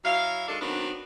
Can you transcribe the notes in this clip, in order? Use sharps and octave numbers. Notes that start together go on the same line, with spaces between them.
F#3 E4 F5
D#3 G#3 D4 A4
D#3 F#3 B3 C4 D4